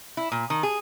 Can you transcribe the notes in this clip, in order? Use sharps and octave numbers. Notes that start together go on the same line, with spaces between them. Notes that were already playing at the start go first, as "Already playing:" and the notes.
E4
A#2
D#3
G#4